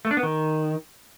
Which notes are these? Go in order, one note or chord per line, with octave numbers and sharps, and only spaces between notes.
A3
D4
B3
D#3